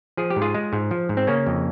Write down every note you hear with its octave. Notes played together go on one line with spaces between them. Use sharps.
F3 G#4
G4
G#2
F4 G#4
G#3
G#2
F3
G#2
C4
C#3 A#3 C#4
F2